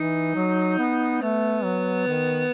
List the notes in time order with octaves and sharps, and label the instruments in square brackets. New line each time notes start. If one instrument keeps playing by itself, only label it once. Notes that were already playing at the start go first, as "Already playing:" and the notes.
Already playing: [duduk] E3 [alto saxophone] D#4
[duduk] F#3
B3
[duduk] A3 [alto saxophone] B3
[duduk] F#3
D#3